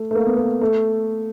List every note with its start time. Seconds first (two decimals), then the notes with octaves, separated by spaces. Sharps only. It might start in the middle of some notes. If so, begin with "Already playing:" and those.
Already playing: A3
0.11 A3
0.15 A#3
0.26 B3
0.38 A#3
0.61 A3